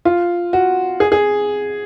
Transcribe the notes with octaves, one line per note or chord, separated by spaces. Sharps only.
F4
F#4
G#4
G#4